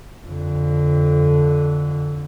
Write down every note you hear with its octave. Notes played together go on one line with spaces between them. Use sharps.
F2 D3